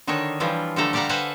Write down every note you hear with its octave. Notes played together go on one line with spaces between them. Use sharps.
D3 D#3 D4 D#4 C#5
E3 F3 G3 F4
D3 F3 G3 A3 A4 A#5
G3 G4 D5 F5 F#5 A#5
A4 B4 C5 F5 F#5 G#5